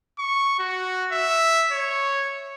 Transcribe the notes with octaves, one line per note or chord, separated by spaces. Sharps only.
C#6
F#4
E5
C#5